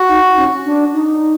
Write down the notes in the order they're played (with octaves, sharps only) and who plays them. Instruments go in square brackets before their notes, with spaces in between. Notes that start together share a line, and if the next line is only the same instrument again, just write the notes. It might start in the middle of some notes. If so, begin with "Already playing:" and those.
Already playing: [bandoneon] F#4
[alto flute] D#4
C#4
D4
D#4